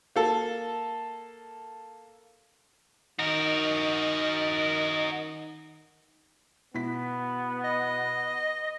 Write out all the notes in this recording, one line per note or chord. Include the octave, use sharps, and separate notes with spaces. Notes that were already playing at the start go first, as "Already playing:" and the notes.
A#3 A4
D#3 F#4 A#4 D#5 D#6
B2 B3 E4 B6
D#5